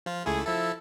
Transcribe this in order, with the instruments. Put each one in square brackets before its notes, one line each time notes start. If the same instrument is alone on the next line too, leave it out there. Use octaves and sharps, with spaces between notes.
[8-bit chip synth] F3 F4
[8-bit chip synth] C#2 A3 E4 [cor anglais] G#4
[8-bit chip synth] F3 A4 [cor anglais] E4